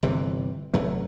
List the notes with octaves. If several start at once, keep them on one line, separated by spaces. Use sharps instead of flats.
G1 C3 E3
F1 F#2 F#3 A3